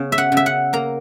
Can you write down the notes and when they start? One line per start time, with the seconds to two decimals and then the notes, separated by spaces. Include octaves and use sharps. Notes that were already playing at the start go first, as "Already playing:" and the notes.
Already playing: C#3 B3
0.12 E5
0.18 F#5
0.32 C#3
0.37 E5
0.46 F#5
0.73 A#3 A#5